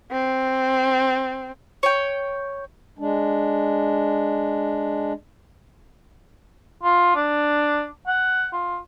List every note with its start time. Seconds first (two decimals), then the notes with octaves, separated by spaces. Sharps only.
0.12 C4
1.83 C#5 G5
2.99 G#3 D4
6.83 F4
7.15 D4
8.07 F#5
8.53 F4